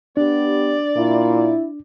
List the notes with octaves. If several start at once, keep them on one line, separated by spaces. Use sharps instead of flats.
B3 D4 G4 D5
A#2 E4